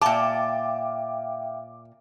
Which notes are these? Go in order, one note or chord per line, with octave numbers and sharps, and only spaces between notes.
A#2 E5 F5 G5 A5 D6